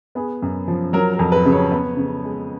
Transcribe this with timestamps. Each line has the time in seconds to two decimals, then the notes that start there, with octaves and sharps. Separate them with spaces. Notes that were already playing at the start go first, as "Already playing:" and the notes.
0.15 B3 G#4
0.42 F#2
0.68 F3
0.93 F#3 A#4
1.13 A#4
1.19 F2
1.32 B4
1.45 C#3
1.52 C#5
1.71 B3
1.97 C#3
2.24 G#3